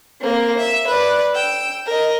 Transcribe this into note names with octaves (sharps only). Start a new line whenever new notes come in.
A#3 C4
E5
B4 D5
G5 E6
A#4 D#5